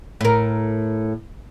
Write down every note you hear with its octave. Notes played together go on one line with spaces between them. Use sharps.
A2 A#4